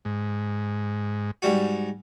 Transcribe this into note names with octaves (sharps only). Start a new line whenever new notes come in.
G#2
G#2 G3 F#4